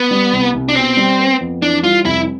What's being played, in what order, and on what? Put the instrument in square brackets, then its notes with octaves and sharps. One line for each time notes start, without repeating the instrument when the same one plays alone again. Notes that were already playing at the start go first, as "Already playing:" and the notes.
Already playing: [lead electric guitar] B3
[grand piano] G3
C2
C2
[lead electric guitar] D4
[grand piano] B2 [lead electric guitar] C4
[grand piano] G3
B3
F2
[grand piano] E3 [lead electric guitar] D4
[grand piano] G3 [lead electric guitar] F4
[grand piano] F1 [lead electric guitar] E4